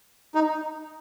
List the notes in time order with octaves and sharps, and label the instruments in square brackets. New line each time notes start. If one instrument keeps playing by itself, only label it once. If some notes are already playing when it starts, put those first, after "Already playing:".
[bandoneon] D#4